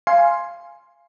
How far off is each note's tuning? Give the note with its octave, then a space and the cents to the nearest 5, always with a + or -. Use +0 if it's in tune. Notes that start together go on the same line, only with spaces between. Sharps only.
F5 -15 G#5 +0 C6 +5